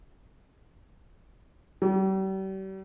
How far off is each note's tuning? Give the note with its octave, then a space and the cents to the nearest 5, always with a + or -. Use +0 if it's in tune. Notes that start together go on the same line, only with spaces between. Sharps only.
G3 -40